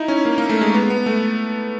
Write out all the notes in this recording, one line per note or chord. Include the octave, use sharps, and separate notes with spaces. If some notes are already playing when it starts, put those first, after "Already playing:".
Already playing: D#4 E4
C#4
A#3
A#3
A3
G#3
B3
B3
A3